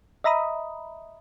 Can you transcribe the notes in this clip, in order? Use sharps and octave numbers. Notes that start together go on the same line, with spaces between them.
D#5 E5 A#5 B5 D#6